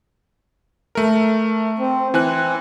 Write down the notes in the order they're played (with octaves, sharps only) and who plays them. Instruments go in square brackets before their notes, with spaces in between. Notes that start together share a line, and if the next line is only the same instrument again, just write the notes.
[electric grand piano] A3 A#4
[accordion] C4
[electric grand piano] E3 G#5 F#6 [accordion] C4